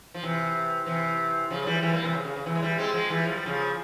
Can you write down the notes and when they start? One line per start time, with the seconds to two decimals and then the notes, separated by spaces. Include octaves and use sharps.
0.14 F3
0.23 C3 E3
0.86 C3 E3
1.50 C#3 F3
1.62 F3
1.67 E3 G3
1.82 E3 G3
1.93 G3 A#3
2.04 C3 E3
2.14 C#3
2.25 C#3
2.36 C#3
2.46 C3 E3
2.55 G#3
2.62 E3 G3
2.78 G#3 C4
2.94 F3 G#3
3.10 E3 G3
3.26 F3
3.36 G3
3.46 C#3 F3